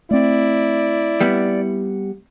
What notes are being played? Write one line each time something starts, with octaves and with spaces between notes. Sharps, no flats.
A3 C4 E4 D5
G3 B3